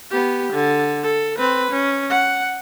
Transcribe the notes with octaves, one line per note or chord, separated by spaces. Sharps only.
B3 G4
D3
A4
C4 B4
C#4
F#5